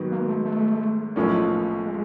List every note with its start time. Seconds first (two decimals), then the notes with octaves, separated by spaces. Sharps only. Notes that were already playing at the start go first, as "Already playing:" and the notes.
Already playing: G#2 D#3 F#3 B3
0.12 A#3
0.29 A3
0.46 A3
1.16 B1 A2 F3 A#3 C#4
1.86 G#3